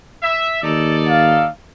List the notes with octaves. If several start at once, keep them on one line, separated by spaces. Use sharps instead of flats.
E5
D#2 D#4 A4 D5
F5